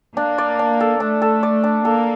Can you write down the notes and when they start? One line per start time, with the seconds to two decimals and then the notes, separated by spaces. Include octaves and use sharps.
0.17 A#3 D4
0.38 D5
0.59 D4
0.80 A4
1.00 A3 D4
1.22 A4
1.43 D5
1.64 D4
1.85 A#3 A4